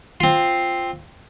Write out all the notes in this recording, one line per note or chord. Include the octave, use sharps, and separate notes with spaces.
C4 F4